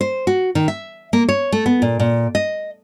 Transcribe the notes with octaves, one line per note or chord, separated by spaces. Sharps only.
C5
F#4
D#3
E5
A#3
C#5
A3
B3
A#2
A#2
D#5